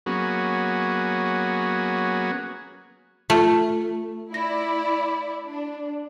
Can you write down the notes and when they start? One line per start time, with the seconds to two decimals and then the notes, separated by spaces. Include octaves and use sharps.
0.06 F#3 A#3 B3 C#4 F#4 G#4
3.30 A3 F4 A4
4.34 E4 D5 A#6
5.44 D4